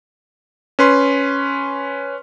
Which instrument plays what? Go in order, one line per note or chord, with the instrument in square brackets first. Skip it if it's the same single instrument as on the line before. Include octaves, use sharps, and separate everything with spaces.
[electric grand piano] C#4 B4 C6